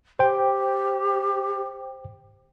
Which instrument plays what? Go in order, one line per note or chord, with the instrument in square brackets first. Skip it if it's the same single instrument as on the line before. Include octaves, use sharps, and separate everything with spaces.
[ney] G4 [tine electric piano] C5 G5